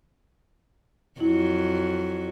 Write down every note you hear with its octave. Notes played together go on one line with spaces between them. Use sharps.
F2 F#3 E4